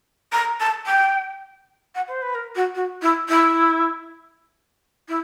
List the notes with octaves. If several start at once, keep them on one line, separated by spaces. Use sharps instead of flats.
A#5
A5
G5
F#5
C5
B4
A#4
F#4
F#4
E4
E4
E4